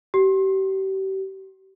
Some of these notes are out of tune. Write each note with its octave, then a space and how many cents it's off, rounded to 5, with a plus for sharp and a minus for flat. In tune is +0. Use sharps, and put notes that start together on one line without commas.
G4 -35